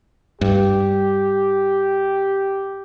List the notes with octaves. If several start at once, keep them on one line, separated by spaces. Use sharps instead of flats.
G2 G4